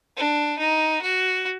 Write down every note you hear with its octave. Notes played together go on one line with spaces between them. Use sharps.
D4
D#4
F#4